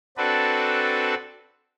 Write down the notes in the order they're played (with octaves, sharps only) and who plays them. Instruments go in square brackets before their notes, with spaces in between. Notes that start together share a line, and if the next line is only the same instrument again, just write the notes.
[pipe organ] C4 D4 F#4 A4 B4